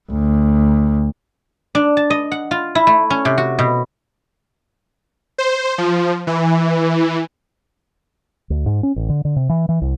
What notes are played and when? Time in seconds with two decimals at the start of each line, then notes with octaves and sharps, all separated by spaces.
0.10 D2
1.75 D4
1.97 A5
2.10 D#5
2.32 F#5
2.51 F4
2.75 E4
2.87 A3
3.10 C#4
3.25 C3
3.38 F#4
3.59 B2
5.38 C5
5.78 F3
6.27 E3
8.50 D2
8.66 G#2
8.83 C#4
8.96 A1
9.09 D3
9.25 D3
9.36 C3
9.49 E3
9.69 E3
9.82 C2